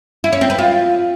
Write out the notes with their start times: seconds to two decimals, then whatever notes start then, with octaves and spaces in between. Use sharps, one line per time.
0.24 E4
0.33 C#4
0.41 C4
0.50 B4
0.58 F4